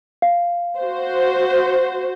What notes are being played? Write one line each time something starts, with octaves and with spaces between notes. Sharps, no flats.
F5
F#4 C5